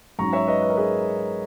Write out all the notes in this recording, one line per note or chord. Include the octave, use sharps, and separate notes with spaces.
G#2 F#3 C#4 A#5 C#6
C#5 E5
B4 D#5
B4
A#4
G#4 B4